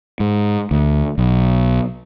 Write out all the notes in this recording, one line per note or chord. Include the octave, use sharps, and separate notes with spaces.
G#2
D2
B1